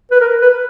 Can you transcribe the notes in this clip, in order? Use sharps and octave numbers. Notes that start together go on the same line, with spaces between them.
B4
A#4
B4